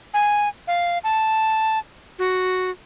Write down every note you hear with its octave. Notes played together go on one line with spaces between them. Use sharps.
G#5
F5
A5
F#4